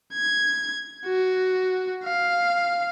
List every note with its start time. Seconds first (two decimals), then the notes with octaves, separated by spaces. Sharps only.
0.14 G#6
1.05 F#4
2.04 F5